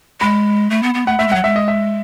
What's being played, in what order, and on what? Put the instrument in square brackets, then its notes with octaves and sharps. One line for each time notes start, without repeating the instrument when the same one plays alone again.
[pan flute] G#3 [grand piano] B5
[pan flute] A3
B3
B3
[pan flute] A3 [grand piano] F#5
[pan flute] A3 [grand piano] E5
[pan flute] G#3
[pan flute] F#3 [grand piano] F#5
[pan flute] G#3 [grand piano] E5
[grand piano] D#5
E5